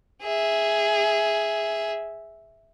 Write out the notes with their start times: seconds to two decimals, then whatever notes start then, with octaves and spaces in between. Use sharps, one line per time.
0.23 G#4 E5